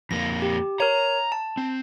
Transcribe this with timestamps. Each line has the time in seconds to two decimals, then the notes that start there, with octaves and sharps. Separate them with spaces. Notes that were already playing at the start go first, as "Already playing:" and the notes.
0.11 F2 A#3 A#6
0.42 G4
0.80 A#4 C#5 A#5
1.32 A5
1.57 C4